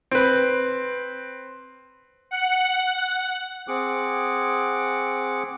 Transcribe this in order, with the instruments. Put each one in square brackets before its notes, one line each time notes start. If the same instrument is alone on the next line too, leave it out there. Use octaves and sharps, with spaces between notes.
[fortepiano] C4 B4
[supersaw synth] F#5
[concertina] C4 G#4 F#5 D6